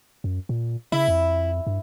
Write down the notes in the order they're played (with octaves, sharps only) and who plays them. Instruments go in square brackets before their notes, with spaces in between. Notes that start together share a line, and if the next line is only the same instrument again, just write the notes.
[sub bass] F#2
A#2
[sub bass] C#3 [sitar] E4
[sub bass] F2
G2